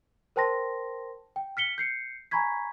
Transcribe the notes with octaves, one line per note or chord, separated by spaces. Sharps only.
A#4 C5 G5 A5 C6 A#6
G5
F6 B6 C#7 G7
G6 C7 C#7
G#5 A#5 B5 C#6 G#6 B6